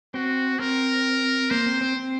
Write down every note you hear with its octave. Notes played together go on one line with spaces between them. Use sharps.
C4 F#4
C4 A#4
A#3 C5
C4
C4
C4